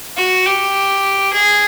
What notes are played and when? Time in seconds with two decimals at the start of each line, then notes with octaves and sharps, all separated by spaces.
0.17 F#4
0.46 G4
1.32 G#4